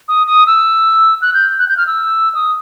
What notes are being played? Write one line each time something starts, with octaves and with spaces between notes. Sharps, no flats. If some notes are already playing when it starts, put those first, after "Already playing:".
D#6
D#6
E6
F#6
G6
F#6
G6
F6
E6
D#6